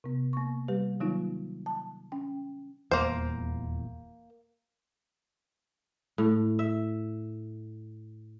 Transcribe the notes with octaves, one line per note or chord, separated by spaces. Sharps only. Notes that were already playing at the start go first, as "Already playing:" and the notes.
C3 B3
A#3 C#6
G3 G4 B4
D#3 F#3 A#3 D#4 F4
A5
C#4 G5
D#1 E2 A#3 C5
A2
E5